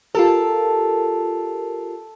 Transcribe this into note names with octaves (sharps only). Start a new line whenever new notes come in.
F4 G4 A4 A#4